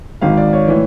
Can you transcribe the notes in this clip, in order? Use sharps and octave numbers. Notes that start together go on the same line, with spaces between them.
G#1 G#2 D#3 F5
D5
C#5
A2 E3